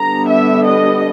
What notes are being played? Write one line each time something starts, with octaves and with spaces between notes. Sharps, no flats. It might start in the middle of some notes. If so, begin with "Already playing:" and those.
Already playing: D3 G3 B3 D4 A#5
E5
D#5